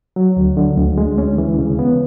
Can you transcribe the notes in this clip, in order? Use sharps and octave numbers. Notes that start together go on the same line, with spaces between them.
F#3
D2
D3
D2
G#3
C#4
E3
C#3
B3